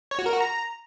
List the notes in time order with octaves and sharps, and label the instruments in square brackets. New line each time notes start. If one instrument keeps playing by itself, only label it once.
[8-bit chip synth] C#5
F#4
A#4
F#4
A#5